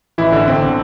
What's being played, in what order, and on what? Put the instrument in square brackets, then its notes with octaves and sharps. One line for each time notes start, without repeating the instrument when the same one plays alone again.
[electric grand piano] A1 E3 E4
D3 D4
G1 C4
D3